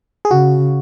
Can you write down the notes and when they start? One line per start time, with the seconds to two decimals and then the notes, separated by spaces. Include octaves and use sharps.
0.25 G#4
0.31 C#3 F#4